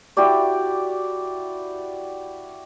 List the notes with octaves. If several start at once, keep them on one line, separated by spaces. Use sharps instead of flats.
E4 F#4 G4 D5